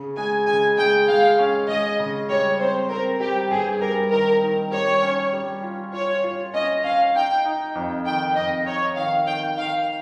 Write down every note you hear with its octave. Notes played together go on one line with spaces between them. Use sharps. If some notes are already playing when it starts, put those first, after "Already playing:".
Already playing: C#3
G#3 G#5
C#3 G#5
G#3 G5
G#3 F5
C#4
G#3 D#5
C#3
G3 C#5
C4 C5
C4 A#4
G3 G4
G2 G#4
G3 A#4
D#3 A#4
D#3
G3 C#5
C#4
G3
F4
F4 C#5
F4
C#4 D#5
C#4 F5
D#4 G5
D#4
F2
D#3 G5
F2 D#5
D#4 C#5
D#3 F5
D#3 G5
D#3 F5